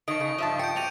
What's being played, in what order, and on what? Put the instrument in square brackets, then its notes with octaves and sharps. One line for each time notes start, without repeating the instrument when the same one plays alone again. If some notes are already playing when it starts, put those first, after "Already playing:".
[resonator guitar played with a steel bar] D#3 [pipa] D4 D#5 [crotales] C#6 D7
[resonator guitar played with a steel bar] C#3
[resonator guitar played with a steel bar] G2 F3 [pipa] D#5 E5 A5
[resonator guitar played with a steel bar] G5 [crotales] G6 C#7
[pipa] C4 F#4 G4 [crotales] D7 D#7 F7